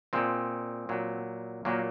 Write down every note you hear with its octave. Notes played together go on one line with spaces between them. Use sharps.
A#2 G#3 C4
A#2 F#3
A#2 F#3 A#3